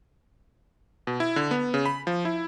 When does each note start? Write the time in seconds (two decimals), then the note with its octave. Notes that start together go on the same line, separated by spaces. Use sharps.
1.07 B2
1.20 E4
1.36 D3
1.51 B3
1.74 C#3
1.86 B5
2.07 F3
2.25 E4